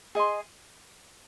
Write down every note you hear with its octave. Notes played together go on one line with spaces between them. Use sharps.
G#4 D#5 C6